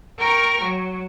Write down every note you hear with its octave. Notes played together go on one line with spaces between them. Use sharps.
A#4 G5 A#5 C#6 F6
F#3